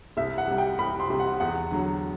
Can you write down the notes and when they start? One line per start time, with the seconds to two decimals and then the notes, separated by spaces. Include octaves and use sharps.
0.17 C2 E5
0.38 F#5
0.48 C3 G3
0.58 G5
0.79 C2 B5
1.00 C6
1.10 C3 G3
1.20 F#5
1.40 E2 F#5
1.71 D3 F#3